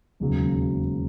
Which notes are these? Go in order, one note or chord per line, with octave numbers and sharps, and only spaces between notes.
E1 D#2 C#3 F#3